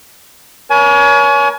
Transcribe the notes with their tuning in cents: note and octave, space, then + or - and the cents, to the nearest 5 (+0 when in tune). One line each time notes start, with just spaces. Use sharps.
A#4 +40 C#5 +25 G#5 +30